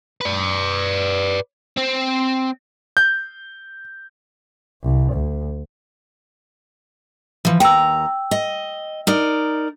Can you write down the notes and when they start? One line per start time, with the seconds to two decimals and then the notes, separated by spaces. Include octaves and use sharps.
0.21 B4 D5
1.77 C4
2.97 G6
4.84 C2
5.13 D2
7.45 E3 F3
7.60 D#2 G5 A#5 E6
8.31 D#5
9.07 D#4 A#4 D5